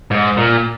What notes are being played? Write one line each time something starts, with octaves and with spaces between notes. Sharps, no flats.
G#2
A#2